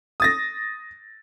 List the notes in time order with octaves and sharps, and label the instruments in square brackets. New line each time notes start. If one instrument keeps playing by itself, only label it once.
[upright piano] D#6 A6 A#6